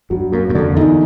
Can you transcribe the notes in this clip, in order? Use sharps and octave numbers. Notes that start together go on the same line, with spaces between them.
G2 F#3
F#2 A#3
F#2
F2 D3
E2 D#4